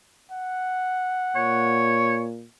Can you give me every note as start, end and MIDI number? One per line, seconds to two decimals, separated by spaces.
0.31 1.93 78
1.36 2.46 46
1.36 2.23 73